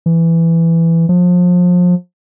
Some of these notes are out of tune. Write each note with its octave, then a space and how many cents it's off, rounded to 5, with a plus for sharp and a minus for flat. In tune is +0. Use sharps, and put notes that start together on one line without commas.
E3 +10
F3 +30